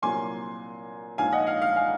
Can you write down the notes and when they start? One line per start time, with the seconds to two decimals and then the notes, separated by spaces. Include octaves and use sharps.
0.02 C2 A#2 F#3 G#5 C6
1.18 A#1 G#2 F3 F5 G#5
1.32 D#5 F#5
1.47 F5
1.62 F5
1.76 F5 G#5